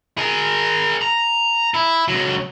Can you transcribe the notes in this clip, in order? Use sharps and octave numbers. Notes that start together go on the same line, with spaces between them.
G#4 A#4
A#5
E4
C#2 F#3